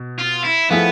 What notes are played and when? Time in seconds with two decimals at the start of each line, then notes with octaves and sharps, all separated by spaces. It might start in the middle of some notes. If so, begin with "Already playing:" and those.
Already playing: B2
0.19 F4
0.45 E4
0.70 F3 A3 B3 E4 G#4